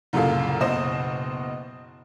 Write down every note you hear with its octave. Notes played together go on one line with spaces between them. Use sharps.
C2 F#2 A#2 C#3 A4 F5
F#1 B2 C5 D#5 D#6 E7